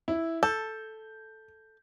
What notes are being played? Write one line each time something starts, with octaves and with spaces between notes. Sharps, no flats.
E4
A4 G6